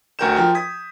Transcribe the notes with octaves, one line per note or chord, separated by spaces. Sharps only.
D2 F#4 A#4 G5 G6 E7
F3 A#4 G5
D#6 G#6 B6